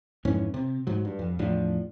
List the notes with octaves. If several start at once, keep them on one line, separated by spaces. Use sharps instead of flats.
F2 G#2 E3 C#4
C3
G#2 F#3
G2
F2
E2 A2 F3 D4